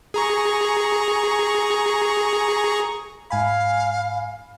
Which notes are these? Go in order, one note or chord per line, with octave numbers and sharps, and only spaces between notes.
G#4 A#5 C#6
G#2 F5 G#5 B5